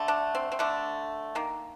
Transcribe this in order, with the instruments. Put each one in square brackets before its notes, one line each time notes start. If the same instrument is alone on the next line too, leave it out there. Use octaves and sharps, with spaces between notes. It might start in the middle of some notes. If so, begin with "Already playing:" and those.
Already playing: [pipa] D3 A3
D4
C4
C4
D3 A3 D4
D#3 A#3